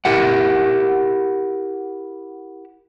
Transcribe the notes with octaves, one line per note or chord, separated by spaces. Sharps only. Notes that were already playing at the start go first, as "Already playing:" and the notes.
E4 G4 A#4 F#5